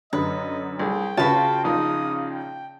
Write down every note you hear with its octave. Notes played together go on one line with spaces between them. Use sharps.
F#2 D3 B4 D#5
C2 G#4 G5
C#3 F4 F#4 B4 C#5 A5 B5
A#1 D#4 A#4 D#6
G5